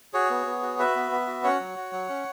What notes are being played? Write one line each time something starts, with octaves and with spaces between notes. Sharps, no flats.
F#4 G#4 C#5
B3
B3
F#4
F#4 B4 E5
B3
B3
F#4
C#4 C#5 F#5
F#3
F#4
F#3
C#4